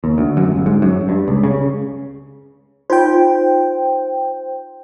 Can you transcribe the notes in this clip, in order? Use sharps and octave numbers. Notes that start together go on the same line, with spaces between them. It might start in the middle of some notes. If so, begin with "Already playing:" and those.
D#2
D2
F#2
G1
G#2
F#2
G2
C#2
C#3
D#4 F4 C5 G5